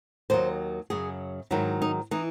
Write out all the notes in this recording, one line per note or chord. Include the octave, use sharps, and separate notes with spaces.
D#2 D#3 F#3 C5
F#2 C#3 F#3 G#4
G#2 D#3 F#3 E4
D#4
E3 D#4